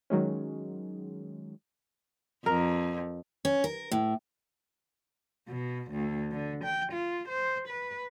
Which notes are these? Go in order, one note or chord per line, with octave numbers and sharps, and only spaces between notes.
D#3 F#3 G#3 C#4
F2 A#4
C#4
A#4
A2
B2
D2
D3
G5
F4
C5
B4